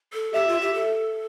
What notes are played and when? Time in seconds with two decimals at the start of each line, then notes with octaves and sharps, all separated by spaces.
0.13 A4
0.33 G4 E5
0.48 F4
0.61 G4
0.74 A4